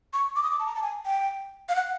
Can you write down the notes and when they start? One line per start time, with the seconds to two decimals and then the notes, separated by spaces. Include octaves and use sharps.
0.13 C#6
0.36 D6
0.43 D#6
0.51 D6
0.59 A5
0.66 A#5
0.75 A5
0.82 G#5
1.05 G5
1.69 F5
1.75 F#5